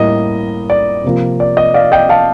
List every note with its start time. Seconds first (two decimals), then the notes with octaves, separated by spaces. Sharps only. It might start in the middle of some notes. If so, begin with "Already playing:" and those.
Already playing: A2 G3 A#3 D#5
0.70 D5
1.04 C3 F3 A#3 F4
1.40 D5
1.57 D#5
1.74 D5 F5
1.92 D#5 G5
2.09 F5 A5